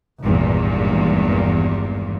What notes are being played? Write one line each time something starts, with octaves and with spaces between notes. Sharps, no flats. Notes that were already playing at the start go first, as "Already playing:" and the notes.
G#1 E2 G2 A#2